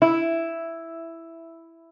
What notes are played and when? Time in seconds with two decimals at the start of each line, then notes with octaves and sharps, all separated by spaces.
0.02 E4